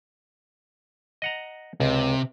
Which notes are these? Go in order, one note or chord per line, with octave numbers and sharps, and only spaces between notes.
D#5 F#5 A#5
C#2 C3